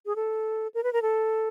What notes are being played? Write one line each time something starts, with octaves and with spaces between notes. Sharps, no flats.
G#4
A4
A#4
B4
A#4
A4